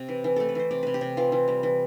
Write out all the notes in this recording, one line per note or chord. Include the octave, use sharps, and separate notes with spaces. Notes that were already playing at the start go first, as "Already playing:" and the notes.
Already playing: C3
E3
E3
A3 A4
B4
E3 C5
C3 D5
C3 B4
G4
C3
E3 F4
E3
G3
E3